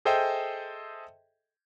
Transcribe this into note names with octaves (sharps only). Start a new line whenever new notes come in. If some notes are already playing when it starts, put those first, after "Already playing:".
G#4 A4 C5 D#5 E5 G5